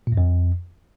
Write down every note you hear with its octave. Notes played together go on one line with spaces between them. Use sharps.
A#2
F#2
F2